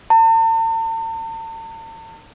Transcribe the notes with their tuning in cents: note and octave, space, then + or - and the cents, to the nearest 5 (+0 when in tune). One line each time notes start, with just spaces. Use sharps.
A5 +45